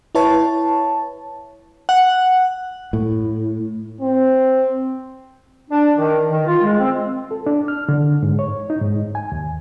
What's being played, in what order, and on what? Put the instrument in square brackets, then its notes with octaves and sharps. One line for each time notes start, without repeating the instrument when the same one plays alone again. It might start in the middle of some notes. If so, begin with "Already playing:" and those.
[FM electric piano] E4 B4 C#5 A5
[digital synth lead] F#5
[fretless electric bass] A2
[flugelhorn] C4
[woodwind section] D4
D#3
D#3
F4
G#3
C4
[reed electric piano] A4
D4
F6
D3
G#2
C#5
D#4
G#2
G#5
D#2